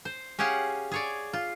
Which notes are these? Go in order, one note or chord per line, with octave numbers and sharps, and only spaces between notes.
C5
C#4 G4 G#4 F5 F#5 G#5
G#4 C#5 D5
F4